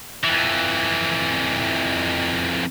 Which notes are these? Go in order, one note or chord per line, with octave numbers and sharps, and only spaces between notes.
F2 E3